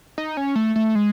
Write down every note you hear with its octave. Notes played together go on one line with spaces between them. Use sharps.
D#4
C#4
A3
A3
G#3